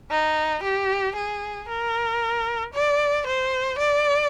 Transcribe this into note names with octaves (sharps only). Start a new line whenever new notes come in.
D#4
G4
G#4
A#4
D5
C5
D5